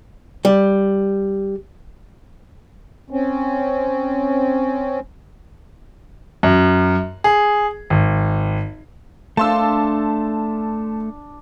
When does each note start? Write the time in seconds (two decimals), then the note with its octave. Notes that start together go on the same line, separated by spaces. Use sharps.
0.45 G3
3.10 C4 C#4
6.43 F#2
7.24 G#4
7.90 G#1
9.37 A3 D4 F5 A5 C6 E6